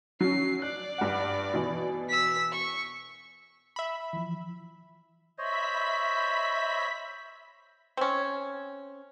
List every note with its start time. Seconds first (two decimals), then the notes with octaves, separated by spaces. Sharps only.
0.21 F#3 C#4 C7
0.62 D5 F#6
0.98 G2 F#5
1.54 B2 E3
2.09 E6 B6
2.51 C#6
3.76 E5 B5
4.13 E3 F3
5.38 C5 C#5 D#5 E5 B5 B6
7.97 C4 C#4